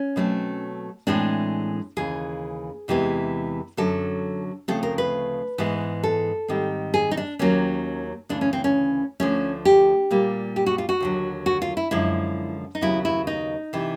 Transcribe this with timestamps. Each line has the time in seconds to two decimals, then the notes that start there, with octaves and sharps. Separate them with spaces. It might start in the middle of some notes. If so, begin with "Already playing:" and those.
Already playing: C#4
0.16 B2 F#3 A3 C4
1.07 A2 E3 G#3 C4 D4
1.97 D#2 C#3 E3 G#4
2.88 E2 C3 E3 G#3 B3
3.77 F#2 D3 F#3 A4
4.68 D2 C#3 F3 A3 C4 A4
4.83 A#4
4.98 B4
5.58 G#2 E3 G#3 B3
6.03 A4
6.48 G#2 D#3 G3 C4
6.94 G#4
7.11 D#4
7.17 D4
7.39 D#2 D#3 F#3 A#3 C#4
8.29 D2 C#3 E3 D4
8.41 C#4
8.53 C4
8.64 C#4
9.20 D2 D3 F3 A3 C#4
9.65 G4
10.11 A#2 G3 A#3
10.56 G4
10.66 F#4
10.78 F4
10.89 F#4
11.00 D#2 D3 F#3
11.46 F#4
11.62 F4
11.77 E4
11.91 F#2 D3 F3 G#3 E4
12.75 D#4
12.81 D#2 C#3 F#3 B3 E4
13.05 E4
13.27 D#4
13.73 C3 E3